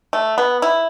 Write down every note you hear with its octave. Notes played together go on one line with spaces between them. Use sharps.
A3
B3
E4